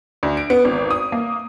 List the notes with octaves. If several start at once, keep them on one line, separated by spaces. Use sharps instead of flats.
D2
D7
B3
G#1
D#6
A#3